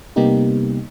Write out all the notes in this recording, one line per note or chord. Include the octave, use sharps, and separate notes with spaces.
C3 G3 A#3 B3 D#4 G4